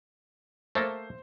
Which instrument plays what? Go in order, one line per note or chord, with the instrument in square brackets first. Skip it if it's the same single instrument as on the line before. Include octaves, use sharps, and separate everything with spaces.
[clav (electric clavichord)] A3 A#3 A4 [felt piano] C5